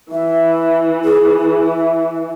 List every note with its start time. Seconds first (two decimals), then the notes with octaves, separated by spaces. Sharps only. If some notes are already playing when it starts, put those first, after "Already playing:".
0.12 E3 E5
1.05 G#4
1.63 E5